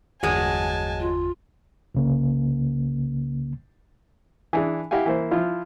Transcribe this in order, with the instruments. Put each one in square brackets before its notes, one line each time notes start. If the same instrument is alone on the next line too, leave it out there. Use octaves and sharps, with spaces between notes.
[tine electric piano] G1 E2 [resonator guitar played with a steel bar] F#3 G#3 [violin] G#5 A5
[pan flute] F4
[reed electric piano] C2 C#3 A#3
[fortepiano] E3 D4 G#4
E4 G4 F5 F#5 G#5
E3 A#3 C5
F3 E4 F4